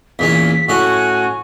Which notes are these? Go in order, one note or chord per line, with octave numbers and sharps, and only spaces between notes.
E2 A#2 C#4 B6
A2 C#4 F#4 G#5